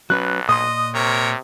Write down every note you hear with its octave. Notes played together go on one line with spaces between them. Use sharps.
B1 F#3 C#4 B4 F#6
A#2 D#5 C6 D#6
C3 A#4 C#5